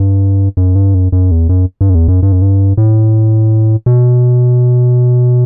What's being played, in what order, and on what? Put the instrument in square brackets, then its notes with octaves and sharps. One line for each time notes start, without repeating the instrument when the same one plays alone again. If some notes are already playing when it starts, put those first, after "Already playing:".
Already playing: [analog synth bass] G2
F#2
G2
F#2
F#2
E2
F#2
G2
F#2
E2
F#2
G2
F#2
G2
A2
B2